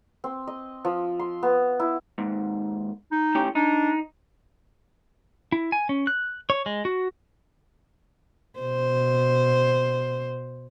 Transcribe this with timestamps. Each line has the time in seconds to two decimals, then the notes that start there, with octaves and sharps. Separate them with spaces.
0.24 C4
0.47 D#5
0.85 F3
1.19 C6
1.43 B3
1.80 E4
2.18 D#2 G#2
3.12 D#4
3.35 A2 C#4 G4
3.55 D4 D#4
5.52 E4
5.72 G#5
5.89 C#4
6.07 F#6
6.50 C#5
6.66 G#3
6.85 F#4
8.59 B2 C5